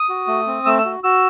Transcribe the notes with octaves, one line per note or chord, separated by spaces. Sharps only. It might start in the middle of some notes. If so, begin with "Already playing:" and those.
Already playing: D#6
F#4
A3
C4
A3 E6
E6
F#4
F#4 E6